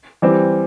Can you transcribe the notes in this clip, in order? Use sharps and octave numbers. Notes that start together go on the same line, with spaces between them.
E3 G3 C4 G4